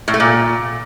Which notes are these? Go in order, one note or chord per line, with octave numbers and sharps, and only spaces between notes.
A2
A3
A#2